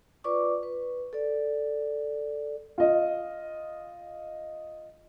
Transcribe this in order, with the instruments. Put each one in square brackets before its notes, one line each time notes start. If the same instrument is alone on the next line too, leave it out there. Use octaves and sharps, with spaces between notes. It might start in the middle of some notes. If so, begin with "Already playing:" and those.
[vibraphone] F4 B4 D5 C#6 D6
B4
A4 D5
[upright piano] F4 D#5